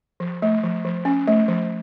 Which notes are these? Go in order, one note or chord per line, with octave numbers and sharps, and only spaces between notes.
F3
A3
F3
F3
C#4
A3
F3